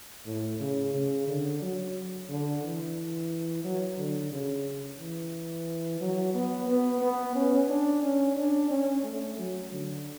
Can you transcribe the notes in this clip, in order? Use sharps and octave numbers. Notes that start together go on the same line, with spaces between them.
A2
C#3
C#3
D3
F#3
D3
E3
F#3
D3
C#3
E3
F#3
B3
B3
B3
C#4
D4
C#4
D4
C#4
A3
F#3
D3